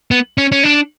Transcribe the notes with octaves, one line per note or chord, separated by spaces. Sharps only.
B3
C#4
C#4
D4